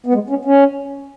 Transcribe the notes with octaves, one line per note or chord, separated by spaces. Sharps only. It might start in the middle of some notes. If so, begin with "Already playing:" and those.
B3
G#3
C#4
C#4